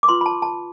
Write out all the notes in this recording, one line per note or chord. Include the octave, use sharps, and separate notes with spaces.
D6
F4 B4 C6
B5
A5
A5